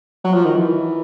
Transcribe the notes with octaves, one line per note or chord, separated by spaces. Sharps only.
F#3
F3
D#3
E3